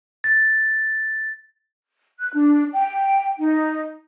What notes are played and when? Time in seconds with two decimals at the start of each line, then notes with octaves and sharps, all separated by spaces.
0.24 A6
2.20 F#6
2.34 D4
2.74 G5
3.39 D#4